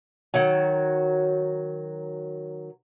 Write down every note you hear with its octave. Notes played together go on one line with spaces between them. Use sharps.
D#3 F#3